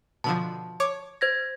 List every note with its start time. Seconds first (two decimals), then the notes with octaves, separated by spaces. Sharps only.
0.24 B2 D3 F3 A5
0.80 C#5 D6
1.21 C5 G#6 A#6